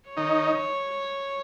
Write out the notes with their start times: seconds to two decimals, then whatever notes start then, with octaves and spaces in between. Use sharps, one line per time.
0.09 C#5
0.17 D#3 D#4